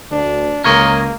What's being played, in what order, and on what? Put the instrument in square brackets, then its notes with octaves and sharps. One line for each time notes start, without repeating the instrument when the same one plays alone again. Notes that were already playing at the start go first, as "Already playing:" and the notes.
[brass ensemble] D2 [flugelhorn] D4
[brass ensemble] C#2 [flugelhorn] A#3 [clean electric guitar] A#4 C#5 D#5